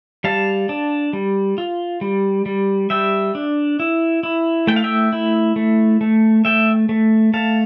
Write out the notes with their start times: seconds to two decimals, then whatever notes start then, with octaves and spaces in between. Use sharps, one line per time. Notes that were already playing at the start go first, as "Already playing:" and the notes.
0.24 G3 F5 A5
0.69 D4
1.13 G3
1.58 F4
2.01 G3
2.46 G3
2.90 G3 E5 G5
3.35 D4
3.80 E4
4.23 E4
4.67 A3 G5
4.76 F5
4.84 E5 G5
5.13 E4
5.56 A3
6.01 A3
6.45 A3 E5 G5
6.89 A3
7.34 A3 F5 A5